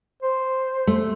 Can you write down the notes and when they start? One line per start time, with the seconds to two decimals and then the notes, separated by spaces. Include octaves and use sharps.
0.22 C5
0.87 A3